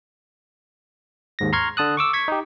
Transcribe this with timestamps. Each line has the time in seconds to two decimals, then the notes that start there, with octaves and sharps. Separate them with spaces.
1.39 D#2 G#2 A#6
1.53 A#5 C6 C#6 F6 G#6
1.77 D3 A5 D#6 F#6
1.97 C#6 D6 E6
2.13 C#6 G#6 B6
2.28 D#4 G4